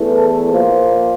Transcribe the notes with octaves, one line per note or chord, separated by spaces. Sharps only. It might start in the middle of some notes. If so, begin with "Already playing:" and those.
Already playing: E2 E3 A3
A4
A#2 F3 A#3 C5